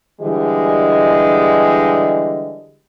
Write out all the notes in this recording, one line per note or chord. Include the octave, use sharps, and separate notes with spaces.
D3 E3 G3 G#3 G4 D#5